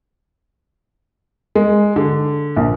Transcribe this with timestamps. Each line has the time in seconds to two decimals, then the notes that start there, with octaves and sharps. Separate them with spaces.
1.55 G#3
1.96 D3
2.56 A#1